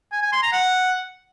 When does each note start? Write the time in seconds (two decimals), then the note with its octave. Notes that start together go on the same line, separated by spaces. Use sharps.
0.12 G#5
0.22 G#5
0.32 C6
0.42 A#5
0.52 F#5